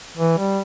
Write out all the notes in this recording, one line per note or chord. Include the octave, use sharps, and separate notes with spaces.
E3
G3